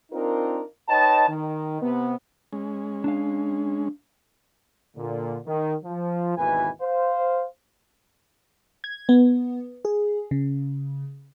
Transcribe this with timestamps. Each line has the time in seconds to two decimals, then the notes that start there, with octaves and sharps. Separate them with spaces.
0.12 C4 D4 D#4 F4 A#4
0.89 D#4 B4 C#5 D#5 G5 A5
1.28 D#3
1.81 C3 B3
2.53 G#3 C#4
3.04 D4 F5
4.97 A#2 D3
5.46 D#3
5.85 F3
6.37 G#1 D#2 B2 E3 B4 G#5
6.81 C5 F5
8.84 G#6
9.09 B3
9.85 G#4
10.31 C#3